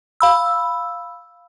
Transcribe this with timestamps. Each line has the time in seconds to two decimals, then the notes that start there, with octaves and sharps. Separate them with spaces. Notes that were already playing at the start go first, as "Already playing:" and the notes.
0.20 F5 B5 E6